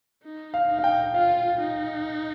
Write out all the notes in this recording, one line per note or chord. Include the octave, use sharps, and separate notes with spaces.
D#4
F5
D#4
F5
G5
F4 F5
D#4